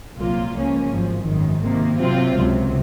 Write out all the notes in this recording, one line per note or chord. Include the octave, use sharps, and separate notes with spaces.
C2 A#2 F#3 A#3 F4
C#2 C#3 F3 A#3 C#4
G#1 F#2 F3
G#1 F#2 D#3
C3 D#3 A#3
C3 F#3 C4 F4
C#2 C3 F#3